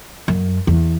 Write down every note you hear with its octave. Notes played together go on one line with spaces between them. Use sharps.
F#2
E2